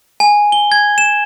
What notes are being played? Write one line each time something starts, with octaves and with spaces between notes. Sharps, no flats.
G#5
G7
G#6
E7